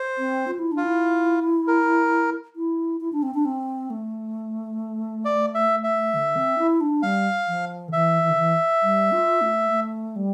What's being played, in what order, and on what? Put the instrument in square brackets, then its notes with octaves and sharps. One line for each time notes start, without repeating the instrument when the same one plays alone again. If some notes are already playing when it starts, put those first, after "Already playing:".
Already playing: [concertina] C5
[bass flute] C4
F4
E4
D4
[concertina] F4
[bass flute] E4
[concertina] A#4
[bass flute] E4
E4
D4
C4
D4
C4
A3
[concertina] D5
E5
E5
[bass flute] D3
C4
E4
D4
[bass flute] G3 [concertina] F5
[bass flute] F3
D3
[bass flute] E3 [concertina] E5
[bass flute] E3
D3
E3
G3
F4
A3
A3
G3